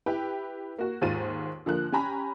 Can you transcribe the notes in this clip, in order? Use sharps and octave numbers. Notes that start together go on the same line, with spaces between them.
E4 G4 B4
A#3 F#4
D#2 G#2 F4 C5 A6 D#7
D3 F3 A#3 F#6
C#4 G4 G#5 A#5 B5